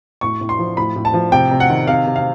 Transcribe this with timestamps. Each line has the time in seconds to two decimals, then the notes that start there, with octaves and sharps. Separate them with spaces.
0.21 A2 C#6
0.41 A2
0.49 C6
0.59 F3
0.77 A2 B5
0.96 A2
1.05 A5
1.14 F3
1.32 C3 G5
1.51 C3
1.60 F#5
1.70 D#3
1.87 C3 F5
2.06 C3
2.16 F5